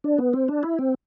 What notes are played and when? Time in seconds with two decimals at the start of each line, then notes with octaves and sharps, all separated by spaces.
0.04 D4
0.18 B3
0.33 C4
0.48 D4
0.63 E4
0.79 C4